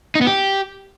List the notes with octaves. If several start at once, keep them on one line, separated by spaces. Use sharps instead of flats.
D#4
B3
G4